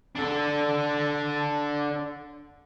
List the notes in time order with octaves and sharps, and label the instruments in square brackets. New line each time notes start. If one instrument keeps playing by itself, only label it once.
[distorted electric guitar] D4 A4